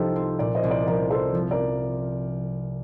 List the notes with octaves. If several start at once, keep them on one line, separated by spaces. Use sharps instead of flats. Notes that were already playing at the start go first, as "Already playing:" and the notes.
Already playing: C2 F3 D#4 G4 A4 C5
C4
A#2 A#4 D5
C5 D#5
C2
A#4 D5
F3 A#4 D5
C4 A4 C5
F3
A#4 D5